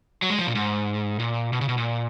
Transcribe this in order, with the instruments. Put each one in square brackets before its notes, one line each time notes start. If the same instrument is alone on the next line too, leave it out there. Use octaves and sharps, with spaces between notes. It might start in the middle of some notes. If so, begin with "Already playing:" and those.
[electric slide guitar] F#3
G#3
F3
A#2
G#2
A#2
B2
C#3
B2
A#2